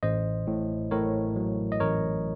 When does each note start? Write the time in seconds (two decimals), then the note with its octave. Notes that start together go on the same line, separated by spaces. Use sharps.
0.03 A1 C5 D#5
0.47 A2
0.91 A2 A#4 C#5
1.36 F#3
1.72 D#5
1.80 A1 A#4 C#5